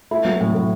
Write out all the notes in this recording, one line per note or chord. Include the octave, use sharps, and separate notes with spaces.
A3 E4
F#3
A2
A2